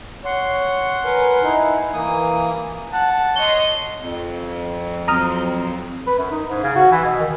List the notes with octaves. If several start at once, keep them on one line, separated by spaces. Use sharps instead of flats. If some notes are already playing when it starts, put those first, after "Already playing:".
C#5 F#5 C6
A#4 B4 G#5
D#4 E4
E3 A#3 D#6
F#5 A5
C#5 D#5 C6 G7
F2
F#3 C4 A#5 D#6 F6
B4
F#2
D#4
G#2
C#3
F#4
E3
B2
D#3